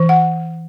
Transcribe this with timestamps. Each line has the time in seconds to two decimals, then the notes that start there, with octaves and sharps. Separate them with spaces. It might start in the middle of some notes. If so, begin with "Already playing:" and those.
Already playing: E3
0.09 F#5